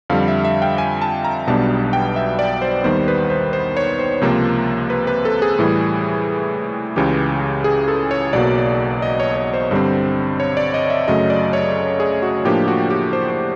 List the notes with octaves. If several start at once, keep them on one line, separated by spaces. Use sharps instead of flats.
F2 D3 G3 F5
E5
E5
G5
G#5
A5
A#5
B1 B2 G3 B3 D4 A5
G5
E5
D5
C5
D#2 D#3 G3 B3 C5
B4
C5
C5
C#5
C5
C#2 C3 F3 A#3
B4
B4
A4
G#4
A2 E3 G3
C#2 C#3 E3 G4
G#4
A4
C#5
B1 B2 F#3 A#3 D5
D#5
C#5
C#5
C5
G2 D3 G3 C4
C#5
D5
D#5
E5
F#2 C#3 F#3 A3 D#5
D5
C#5
G#4
F#4
A2 F3 A#3 D4 G4
F#4
G4
C5
C5